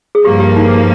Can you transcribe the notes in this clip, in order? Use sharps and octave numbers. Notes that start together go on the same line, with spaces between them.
G#4
G2 F3 A#3 G4
G4
D#4